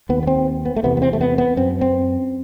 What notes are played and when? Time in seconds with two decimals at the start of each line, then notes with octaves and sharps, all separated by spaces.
0.09 D#2 B3
0.23 B3
0.27 C4
0.65 B3
0.76 A3
0.84 E2 C3 B3
0.97 B3
1.02 C4
1.13 A3
1.21 B3
1.38 B3
1.57 F#2 C4
1.81 C4